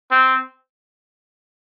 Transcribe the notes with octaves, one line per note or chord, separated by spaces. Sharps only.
C4